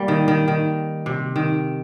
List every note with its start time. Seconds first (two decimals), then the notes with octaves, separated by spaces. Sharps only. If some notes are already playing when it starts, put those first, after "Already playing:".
Already playing: G3 A#3
0.08 D#3
0.28 D#3
0.48 D#3
1.06 C3
1.36 D#3